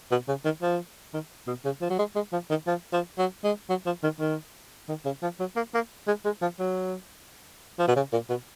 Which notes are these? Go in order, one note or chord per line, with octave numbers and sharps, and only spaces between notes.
B2
C#3
D#3
F3
D#3
B2
C#3
F3
F#3
G#3
G#3
F3
D#3
F3
F3
F#3
G#3
F#3
F3
D#3
D#3
D#3
C#3
F3
F#3
A#3
A#3
G#3
G#3
F3
F#3
F3
B2
C#3
A#2
B2